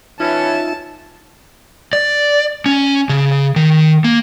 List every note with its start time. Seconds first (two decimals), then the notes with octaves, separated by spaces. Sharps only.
0.20 E3 C#4 D#4 F4 E5 A5
1.93 D5
2.66 C#4
3.09 C#3
3.56 D#3
4.04 A#3